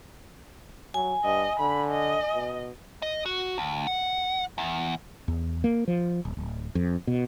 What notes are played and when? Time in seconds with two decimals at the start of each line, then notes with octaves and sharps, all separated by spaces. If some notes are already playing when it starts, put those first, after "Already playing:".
0.94 F#3 G#5
1.24 G2 D#5
1.60 D3 B5
1.91 D#5
2.34 B2
3.02 D#5
3.26 F#4
3.58 D2
3.87 F#5
4.58 E2
5.28 E2
5.64 A#3
5.88 F3
6.25 D#1
6.37 D1
6.75 F2
7.07 B2